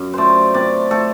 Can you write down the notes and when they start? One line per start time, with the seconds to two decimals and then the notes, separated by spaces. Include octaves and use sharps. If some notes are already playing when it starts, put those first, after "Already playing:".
Already playing: F#2
0.14 A3 C5 D5
0.54 C3 D5
0.91 A3 A4